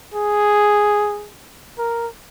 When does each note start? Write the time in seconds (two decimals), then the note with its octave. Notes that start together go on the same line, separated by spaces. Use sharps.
0.14 G#4
1.78 A#4